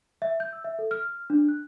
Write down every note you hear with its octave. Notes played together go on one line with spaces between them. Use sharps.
E5
G6
E6
E5
A4
F6
D4
F#6